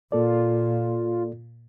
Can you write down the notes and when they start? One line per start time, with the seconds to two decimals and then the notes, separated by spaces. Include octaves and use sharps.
0.12 A#2 A#3 F4 A4 D5